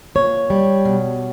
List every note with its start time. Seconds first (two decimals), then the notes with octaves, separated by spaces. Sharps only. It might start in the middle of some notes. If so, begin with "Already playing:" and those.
0.15 A#2 C#5
0.50 G3
0.85 B2